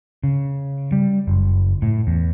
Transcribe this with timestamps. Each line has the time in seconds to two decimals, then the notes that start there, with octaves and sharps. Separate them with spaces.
0.24 C#3
0.92 G3
1.28 F#1
1.82 A2
2.07 E2